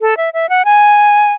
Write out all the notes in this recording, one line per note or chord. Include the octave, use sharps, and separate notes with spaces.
A4
E5
E5
F#5
G#5